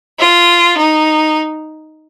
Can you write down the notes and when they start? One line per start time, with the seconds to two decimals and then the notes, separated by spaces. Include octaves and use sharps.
0.18 F4
0.77 D#4